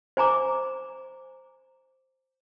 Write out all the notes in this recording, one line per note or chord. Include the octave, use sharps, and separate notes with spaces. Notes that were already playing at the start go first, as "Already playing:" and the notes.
C5 G#5 A#5 D6